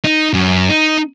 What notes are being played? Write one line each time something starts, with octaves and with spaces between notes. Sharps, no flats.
D#4
F#2
D#4